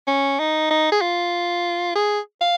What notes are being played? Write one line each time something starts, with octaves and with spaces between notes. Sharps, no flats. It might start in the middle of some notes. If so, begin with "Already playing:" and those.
C#4
D#4
D#4
G#4
F4
G#4
F5